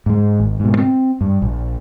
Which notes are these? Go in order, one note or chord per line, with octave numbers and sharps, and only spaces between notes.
G#2 G#3
G#1
G#2 B2
C4
G2
A#1